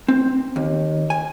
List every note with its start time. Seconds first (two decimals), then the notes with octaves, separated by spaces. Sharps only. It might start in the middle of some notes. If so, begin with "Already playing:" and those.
0.08 C4
0.56 D#2
1.10 G#5